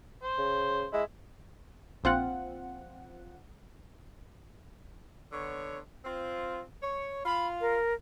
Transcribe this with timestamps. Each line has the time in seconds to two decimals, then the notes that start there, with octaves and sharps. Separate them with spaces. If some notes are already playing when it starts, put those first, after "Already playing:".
0.23 C5
0.38 C#3
0.93 G#3 E4
2.04 A#1 C4 F4 F#5
5.32 D3 B3 C#5
6.05 C4 F4
6.82 C#5
7.25 F4 F5 B5
7.61 A#4